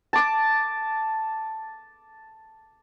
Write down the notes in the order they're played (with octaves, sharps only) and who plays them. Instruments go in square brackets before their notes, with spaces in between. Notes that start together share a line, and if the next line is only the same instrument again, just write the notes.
[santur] A5 D6